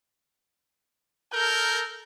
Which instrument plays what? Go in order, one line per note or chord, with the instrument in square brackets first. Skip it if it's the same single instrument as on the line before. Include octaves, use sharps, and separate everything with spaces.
[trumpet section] A4 A#4 [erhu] G6